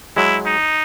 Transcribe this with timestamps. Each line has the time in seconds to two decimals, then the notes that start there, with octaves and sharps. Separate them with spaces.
0.17 F#3 G#3 E4
0.46 D#4